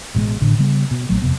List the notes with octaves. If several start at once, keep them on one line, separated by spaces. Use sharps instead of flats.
A1 B2 D3 G#3
A1 A2 D3
C#3 G3 B3
B2
A#1 F#3 A3
F2 C3 B3